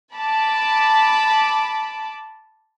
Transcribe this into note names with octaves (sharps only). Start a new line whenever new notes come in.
A5 B5 D6